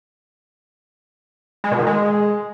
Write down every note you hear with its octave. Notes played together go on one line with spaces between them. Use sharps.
G#3
B2
D#3
G#3